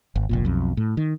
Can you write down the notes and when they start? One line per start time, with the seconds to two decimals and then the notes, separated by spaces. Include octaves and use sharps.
0.16 G#1
0.29 F1 A#1 A#2
0.45 B1 F2
0.77 A2
0.97 D#3